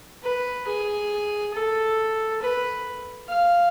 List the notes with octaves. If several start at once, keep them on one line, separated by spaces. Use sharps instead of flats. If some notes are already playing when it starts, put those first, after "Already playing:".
B4
G#4
A4
B4
F5